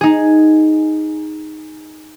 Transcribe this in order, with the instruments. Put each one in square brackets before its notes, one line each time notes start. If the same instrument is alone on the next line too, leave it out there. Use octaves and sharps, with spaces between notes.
[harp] D#4 G#4